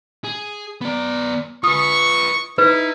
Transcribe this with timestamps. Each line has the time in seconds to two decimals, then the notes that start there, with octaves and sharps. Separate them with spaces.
0.24 G#4
0.81 B3 D5
1.64 F4 B4 C#6 D#6
2.58 D#4 E4 B4